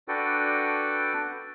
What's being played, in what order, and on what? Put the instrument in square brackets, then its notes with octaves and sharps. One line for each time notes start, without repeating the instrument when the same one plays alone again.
[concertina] D4 F#4 A4 B4 D5 G5